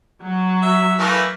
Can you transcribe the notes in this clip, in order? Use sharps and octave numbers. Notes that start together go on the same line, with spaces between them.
F#3 F#4
E5
E3 A3 A#3